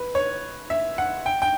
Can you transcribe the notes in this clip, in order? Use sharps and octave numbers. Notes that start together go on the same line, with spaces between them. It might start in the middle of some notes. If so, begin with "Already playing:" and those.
Already playing: B4
C#5
E5
F#5
G5
G5